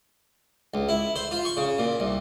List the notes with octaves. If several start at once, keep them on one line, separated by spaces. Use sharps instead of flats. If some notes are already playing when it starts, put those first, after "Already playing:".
C#2
E4
C5
F4
C#6
C#3
A#2
C2